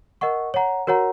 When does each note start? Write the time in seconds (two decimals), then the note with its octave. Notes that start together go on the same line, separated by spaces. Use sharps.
0.21 A#4 D#5 F#5 C#6
0.54 C#5 F#5 A#5
0.87 F#4 A#4 C#5 F#5 A#5